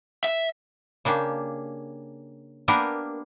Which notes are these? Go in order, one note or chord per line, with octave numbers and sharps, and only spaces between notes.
E5
C#3 A#3 D4 G4
A#3 B3 D4 G4 A#4 B4